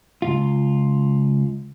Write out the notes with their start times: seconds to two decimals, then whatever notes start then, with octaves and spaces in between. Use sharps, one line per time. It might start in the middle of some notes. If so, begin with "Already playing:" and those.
0.22 C#2 G#2 F4